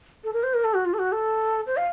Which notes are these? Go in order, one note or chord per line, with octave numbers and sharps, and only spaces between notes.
A4
A#4
C5
A#4
A4
F#4
F4
A4
F#4
A4
C5
F5